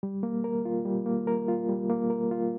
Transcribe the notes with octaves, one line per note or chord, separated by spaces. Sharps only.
G3
A#3
A#4
F4
G3
A#3
A#4
F4
G3
A#3
A#4
F4